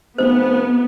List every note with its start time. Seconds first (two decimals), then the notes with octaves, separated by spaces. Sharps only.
0.18 F1 B3 C5